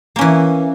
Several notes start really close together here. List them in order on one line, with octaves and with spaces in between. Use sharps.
A#3 C#4 E3